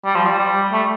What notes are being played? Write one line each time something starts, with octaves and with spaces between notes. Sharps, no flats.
G3
F3
G3
G3
A3